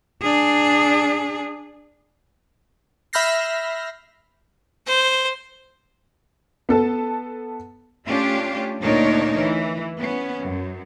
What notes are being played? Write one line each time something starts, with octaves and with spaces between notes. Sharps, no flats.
D4 G#4
E5 B5 F6 G6 A#6 C7
C5
B3 A4 A5
A3 C#4 D4 F4 G4
D2 A#2 D4 D#4 A#4 C#5
E3
B3 C#4
F#2